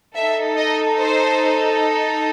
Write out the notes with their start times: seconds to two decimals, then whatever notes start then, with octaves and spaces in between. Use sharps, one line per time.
0.15 D#4 A4 E5
0.57 D#5
0.99 C5